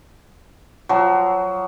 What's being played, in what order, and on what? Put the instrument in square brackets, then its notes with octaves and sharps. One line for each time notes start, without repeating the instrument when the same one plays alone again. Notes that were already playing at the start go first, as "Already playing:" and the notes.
[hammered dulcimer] F3 F#3